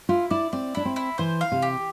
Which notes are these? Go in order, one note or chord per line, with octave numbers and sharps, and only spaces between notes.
E4 F4
E4 D5
C4 D5
D4 E4
C4
E4
E3 C5
F5
C3
G4